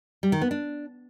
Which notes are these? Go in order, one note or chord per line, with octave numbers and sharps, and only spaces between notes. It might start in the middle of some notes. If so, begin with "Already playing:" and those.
G3
D#3
B3
D4